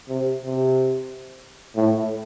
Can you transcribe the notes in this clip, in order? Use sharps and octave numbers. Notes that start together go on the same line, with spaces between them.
C3
C3
A2